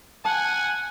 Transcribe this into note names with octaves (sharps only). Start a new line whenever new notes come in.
F#5 G#5 A5